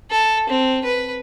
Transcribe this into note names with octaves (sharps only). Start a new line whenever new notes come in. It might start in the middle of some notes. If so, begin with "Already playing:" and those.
A4
C4
B4